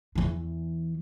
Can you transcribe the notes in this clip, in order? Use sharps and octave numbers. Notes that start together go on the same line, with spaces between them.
E2 E3